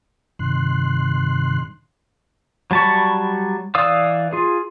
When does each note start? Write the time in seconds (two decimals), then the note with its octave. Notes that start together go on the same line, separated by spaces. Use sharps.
0.39 G2 C3 D#3 C6 F#6
2.71 F#3 G3 A5 B5 C#6
3.75 E3 D5 F5 D#6 E6
4.33 F4 G#4